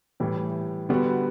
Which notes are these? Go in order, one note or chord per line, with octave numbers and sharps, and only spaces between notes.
A2 E3 G3
D3 G3 B3 F#4